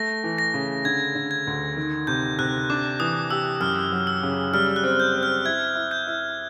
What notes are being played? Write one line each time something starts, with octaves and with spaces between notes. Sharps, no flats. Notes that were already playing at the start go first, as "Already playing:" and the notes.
Already playing: A3 A#6
E3
A#6
C#3
D3 G#6
D3
G#6
D2
D#3
C3 G6
C3 F#6
D4 D6
E3 D#6
G4 E6
F#2 F6
F#3
E6
C#3
G3 F6
F#6
C4
G6
C4
F6
E4 G#6
E4
G6
E4